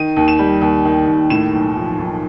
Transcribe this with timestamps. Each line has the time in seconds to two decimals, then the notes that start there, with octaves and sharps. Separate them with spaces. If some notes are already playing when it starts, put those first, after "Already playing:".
Already playing: D#3 D#7
0.17 D#2
0.28 E7
0.39 G3
0.62 D#2
0.85 D#3
1.07 D#2
1.30 A2 E7
1.53 B1
1.76 F3
1.99 B1